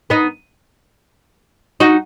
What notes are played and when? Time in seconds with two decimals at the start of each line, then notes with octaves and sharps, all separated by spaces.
0.10 B3 D#4
1.80 D#4 F#4